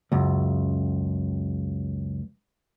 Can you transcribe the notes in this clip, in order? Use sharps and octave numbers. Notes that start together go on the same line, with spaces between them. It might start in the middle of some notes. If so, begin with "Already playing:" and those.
C#2 F#2